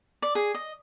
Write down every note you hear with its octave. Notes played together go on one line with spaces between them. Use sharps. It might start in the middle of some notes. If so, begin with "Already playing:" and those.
D5
G#4
D#5